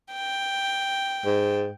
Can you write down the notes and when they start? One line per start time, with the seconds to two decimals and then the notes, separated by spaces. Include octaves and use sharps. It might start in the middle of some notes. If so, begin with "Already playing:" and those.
0.12 G5
1.25 G#2